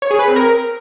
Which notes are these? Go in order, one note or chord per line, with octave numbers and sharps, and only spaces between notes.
C#5
G#4
B4
C4
A#4